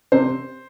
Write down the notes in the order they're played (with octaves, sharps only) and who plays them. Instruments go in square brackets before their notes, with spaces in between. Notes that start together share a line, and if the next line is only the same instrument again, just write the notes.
[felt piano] C3 C5